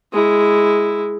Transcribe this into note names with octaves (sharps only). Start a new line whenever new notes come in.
G#3 E4